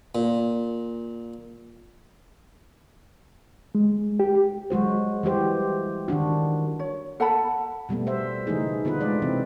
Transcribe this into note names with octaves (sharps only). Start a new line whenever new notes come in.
A#2
G#3
G4
F#3 G#3 F#4 C5
E3 G3 G4 C5
D#3 E3 D4 F#4
C#5
A4 F#5 A5 B5
B2 G3 A3 B3
C5 E5
C#3 E3 A3 D#4 G#4
D3 B3 F4 B4
G#3 A3 D5
C3 E3 C4